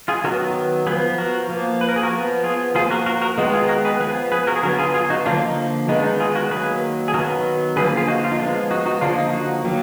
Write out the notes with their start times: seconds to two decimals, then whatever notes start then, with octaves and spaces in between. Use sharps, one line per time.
0.08 F4 G#4
0.24 D#3 F#3 B3 F#4 A#4
0.87 F3 B3 G#4 B4
1.18 F#4 A#4
1.50 F3 A#3
1.81 B4
1.89 A#4
1.96 G#4
2.03 F#4 A#4
2.12 F3 B3
2.44 F4 G#4
2.75 F3 A#3 F4 G#4
2.90 F#4 A#4
3.06 F#4 A#4
3.21 F#4 A#4
3.38 D#3 G#3 B3 D#4 F#4
3.53 F4 G#4
3.69 F#4 A#4
3.85 G#4 B4
4.00 F3 B3 G#4 B4
4.32 G#4 B4
4.47 F#4 A#4
4.56 G#4
4.63 D3 F#3 B3 F#4 A#4
4.79 F4 G#4
4.94 F4 G#4
5.10 D#4 F#4
5.26 D3 F3 A#3 D4 F4
5.42 D#4
5.88 D#3 G#3 B3 D#4
5.99 D4
6.04 D#4
6.20 F4 G#4
6.35 F#4 A#4
6.51 D#3 F#3 A#3 G#4 B4
7.08 G#4
7.14 D#3 F#3 B3 F#4 A#4
7.76 D3 F3 A#3 G#4 B4
7.97 F4 G#4
8.08 D#4 F#4
8.24 F4
8.31 D#4
8.39 F3 G#3 B3 D4 F4
8.71 D#4 F#4
8.86 D#4 F#4
9.01 D3 F3 A#3 D4 F4
9.18 D#4
9.33 D#4 F#4
9.64 D#3 F#3 A#3